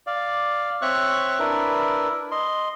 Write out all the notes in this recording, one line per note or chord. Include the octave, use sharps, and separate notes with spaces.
D5 F5
C4 C#5 E5 C#6 F#6
D4 E4 A#4 B4 E5
D#5 C6